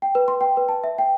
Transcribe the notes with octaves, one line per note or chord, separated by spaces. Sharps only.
G5
B4
C6
G5
B4
A5
E5
G5